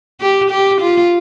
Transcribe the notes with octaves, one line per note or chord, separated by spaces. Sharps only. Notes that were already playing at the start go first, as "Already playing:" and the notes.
G4
G4
F4